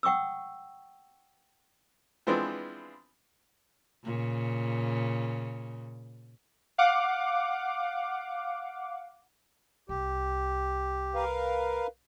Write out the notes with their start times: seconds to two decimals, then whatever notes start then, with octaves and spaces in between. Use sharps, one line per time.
0.03 F#5 G5 C#6 D#6 E6
2.27 E3 F3 G#3 B3 C4 D4
4.05 A#2 C#3
6.78 F5 F#5 D6
9.89 C2 G4
11.15 A#4 B4 F5